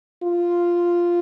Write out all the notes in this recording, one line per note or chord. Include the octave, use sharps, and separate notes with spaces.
F4